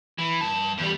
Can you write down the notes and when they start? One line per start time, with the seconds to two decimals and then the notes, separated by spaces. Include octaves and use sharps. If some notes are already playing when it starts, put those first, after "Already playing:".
0.18 E3
0.41 G2 A5
0.78 E2 G3